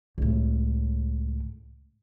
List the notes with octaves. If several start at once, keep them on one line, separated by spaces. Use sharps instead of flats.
C#2 A2